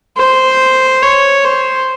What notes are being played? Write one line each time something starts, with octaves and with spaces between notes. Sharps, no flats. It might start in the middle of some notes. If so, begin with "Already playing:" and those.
C5
C#5
C5